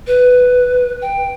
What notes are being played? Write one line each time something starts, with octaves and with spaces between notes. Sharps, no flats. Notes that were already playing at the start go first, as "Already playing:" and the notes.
B4
G5